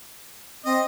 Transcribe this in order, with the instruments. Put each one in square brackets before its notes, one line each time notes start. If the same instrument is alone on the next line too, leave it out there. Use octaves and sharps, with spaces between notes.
[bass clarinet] C4 [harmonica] D#5